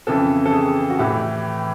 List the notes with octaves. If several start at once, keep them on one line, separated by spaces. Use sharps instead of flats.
F2 C#3 E3 A4
A4
G#4
F#4
A2 E3 G4